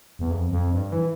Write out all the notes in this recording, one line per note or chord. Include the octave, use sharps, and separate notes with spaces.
E2
F2
F2
G2
E3